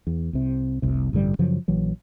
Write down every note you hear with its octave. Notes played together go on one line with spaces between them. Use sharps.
E2
C2 C3
F1 C2 C3
A1 G2 D3 G3
F#2 C#3 F3 F#3
A#1 E3 F#3